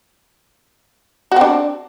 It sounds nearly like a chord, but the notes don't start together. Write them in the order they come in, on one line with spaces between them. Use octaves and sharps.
F#4 C4 D4